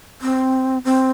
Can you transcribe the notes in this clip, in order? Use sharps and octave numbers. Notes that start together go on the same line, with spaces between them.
C4
C4